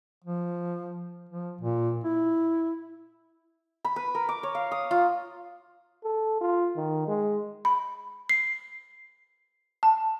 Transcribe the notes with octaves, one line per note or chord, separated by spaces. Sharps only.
F3
F3
A#2
E4
B5
B4
A#4
D6
C#5
F5
D#6
F4
A4
F4
D#3
G#3
B5
C7
A5